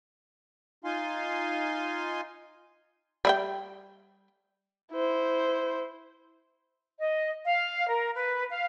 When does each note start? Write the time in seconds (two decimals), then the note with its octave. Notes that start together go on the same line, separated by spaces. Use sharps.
0.84 D#4 F4 F5 G#5 C6
3.25 G3 E5 G5
4.92 E4 C5
7.00 D#5
7.45 F5
7.88 A#4
8.15 B4
8.49 F5